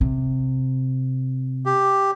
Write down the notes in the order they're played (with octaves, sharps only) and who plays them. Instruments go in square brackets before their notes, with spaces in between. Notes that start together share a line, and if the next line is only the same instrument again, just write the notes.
[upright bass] C3
[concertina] G4